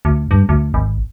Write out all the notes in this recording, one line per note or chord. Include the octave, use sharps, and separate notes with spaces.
D2
G2
D2
G#1